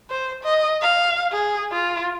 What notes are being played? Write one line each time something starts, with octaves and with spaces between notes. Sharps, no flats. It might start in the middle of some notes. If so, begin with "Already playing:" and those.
C5
D#5
F5
G#4
F4